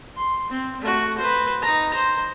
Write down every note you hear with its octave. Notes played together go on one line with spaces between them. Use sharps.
C6
C4
A3 F#4
B4 C5
D#4 A#5
C5